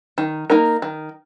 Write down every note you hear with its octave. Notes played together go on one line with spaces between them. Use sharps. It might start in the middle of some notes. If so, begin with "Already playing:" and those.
D#3
A#3 D#4 A#4
D#3